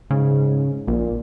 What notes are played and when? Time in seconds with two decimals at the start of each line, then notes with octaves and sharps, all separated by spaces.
0.11 G#2 C#3
0.88 A#1 A#2